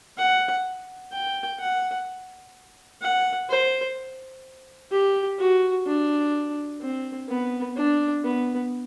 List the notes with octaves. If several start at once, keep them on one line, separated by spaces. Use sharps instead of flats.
F#5
G5
F#5
F#5
C5
G4
F#4
D4
C4
B3
D4
B3